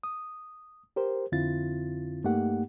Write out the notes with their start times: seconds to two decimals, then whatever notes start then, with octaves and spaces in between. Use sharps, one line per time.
0.03 D#6
0.96 G4 A#4 C5
1.32 F2 D3 C4 E4 F4 A6
2.24 G2 A3 A#3 D#4 G4 F#5